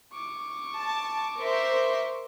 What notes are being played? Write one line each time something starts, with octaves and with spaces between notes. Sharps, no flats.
C#6 D6
A5
A#4 C5 E5